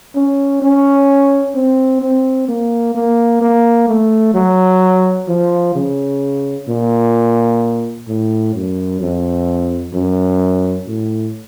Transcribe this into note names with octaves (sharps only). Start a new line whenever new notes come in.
C#4
C#4
C4
C4
A#3
A#3
A#3
A3
F#3
F3
C#3
A#2
A2
F#2
F2
F#2
A2